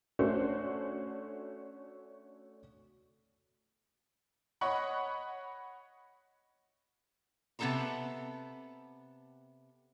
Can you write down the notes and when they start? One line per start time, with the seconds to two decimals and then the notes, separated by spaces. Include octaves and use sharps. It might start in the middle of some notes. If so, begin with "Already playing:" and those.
0.19 A3 C#4 D4 F#4 C5
4.61 C#5 D#5 F#5 B5 C#6
7.59 C3 B3 D#4 A4 A5 A#5